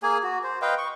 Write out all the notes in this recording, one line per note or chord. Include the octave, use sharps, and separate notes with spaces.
A#3 G#4 G#5
F#4
C5
B4 D#5 F5 G5
C#6